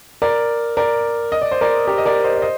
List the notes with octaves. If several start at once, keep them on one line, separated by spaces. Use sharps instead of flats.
A#4 D5
A#4 D5
D#5
D5
C5
A#4 D5
G4 A#4
D#5
A#4 D5
C5 D#5
D5
C5 D#5